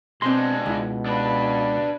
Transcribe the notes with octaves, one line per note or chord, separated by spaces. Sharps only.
B2 G#3 C4 D4 C6
C#2 B2 E4
D4 B4